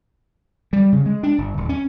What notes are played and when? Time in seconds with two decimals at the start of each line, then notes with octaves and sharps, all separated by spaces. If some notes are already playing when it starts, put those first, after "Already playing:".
0.73 G3
0.92 C#3
1.06 G#3
1.23 D4
1.38 G1
1.57 D#1
1.69 C#4